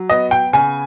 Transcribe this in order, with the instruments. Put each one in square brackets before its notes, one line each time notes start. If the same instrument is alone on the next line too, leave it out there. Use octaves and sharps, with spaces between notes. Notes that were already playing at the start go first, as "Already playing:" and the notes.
Already playing: [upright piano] F#3
B3 D#5
G5
C#3 G#5